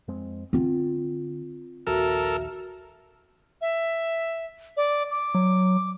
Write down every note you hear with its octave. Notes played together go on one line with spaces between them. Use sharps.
F2 G#3 C4
D3 C4 F4
A#1 D#2 F#4 A4 A#4 E5
E5
D5
D6
F#3